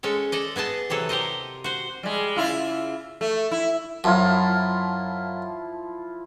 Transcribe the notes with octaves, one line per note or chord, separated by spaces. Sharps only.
G#3 C#4 A4
A4 D5 D#5
B3 G#4 D#5 A5
C3 E3 F#3 A4
G4 A#4 C5 D#5
F#4 C5
G3 G#3
C#3 E4 F4
A3
E4
F#2 F3 E4 F4